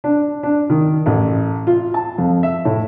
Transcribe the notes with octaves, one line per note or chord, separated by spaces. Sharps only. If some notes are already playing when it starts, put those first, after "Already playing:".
D4
D4
D#3
A1
F4
A5
F2
E5
A2